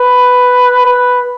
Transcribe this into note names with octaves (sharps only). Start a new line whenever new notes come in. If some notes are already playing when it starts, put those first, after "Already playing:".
Already playing: B4
B4